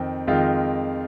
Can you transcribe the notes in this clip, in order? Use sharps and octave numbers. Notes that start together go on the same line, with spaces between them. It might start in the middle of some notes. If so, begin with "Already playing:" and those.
Already playing: F2 D#3 C4
F2 D#3 G#3 F4